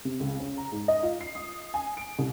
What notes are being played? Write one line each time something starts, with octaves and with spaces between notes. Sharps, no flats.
C3
C#2
C#4
A#5
G#2
D#5
F4
C7
D#6
G#5
D7
C2